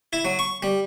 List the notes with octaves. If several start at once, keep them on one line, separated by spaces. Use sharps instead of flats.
E4
F#3
C#6
G3